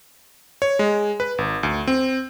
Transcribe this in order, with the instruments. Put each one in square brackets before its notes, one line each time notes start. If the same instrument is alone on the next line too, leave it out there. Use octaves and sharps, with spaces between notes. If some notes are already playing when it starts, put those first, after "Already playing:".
[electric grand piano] C#5
G#3
B4
G#1
D2
C4